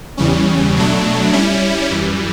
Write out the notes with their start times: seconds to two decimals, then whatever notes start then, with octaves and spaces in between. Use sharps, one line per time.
0.17 E2 C#3 E3 G3 C#4
0.76 B2 F#3 A3 D4
1.33 G3 C#4 E4
1.91 F#2 E3 G3